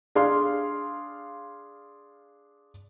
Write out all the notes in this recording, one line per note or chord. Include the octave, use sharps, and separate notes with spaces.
D4 G#4 F5 C6